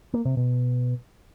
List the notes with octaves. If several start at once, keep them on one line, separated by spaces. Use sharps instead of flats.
A#3
C3
B2